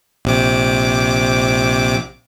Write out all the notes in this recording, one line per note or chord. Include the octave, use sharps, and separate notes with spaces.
A#1 C3 D6